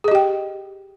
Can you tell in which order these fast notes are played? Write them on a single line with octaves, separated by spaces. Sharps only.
G#4 D#5 G4 G5